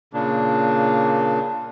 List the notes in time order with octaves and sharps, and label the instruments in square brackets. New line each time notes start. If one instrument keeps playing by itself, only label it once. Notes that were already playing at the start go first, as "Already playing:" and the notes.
[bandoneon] A#2 C#3 A#3 D4